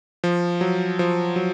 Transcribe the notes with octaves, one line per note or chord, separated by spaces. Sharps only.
F3
F#3
F3
F#3